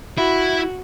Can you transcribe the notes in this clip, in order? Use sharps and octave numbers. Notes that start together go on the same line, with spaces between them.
E4 F#4 E5